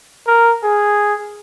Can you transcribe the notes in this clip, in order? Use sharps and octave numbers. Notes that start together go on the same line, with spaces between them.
A#4
G#4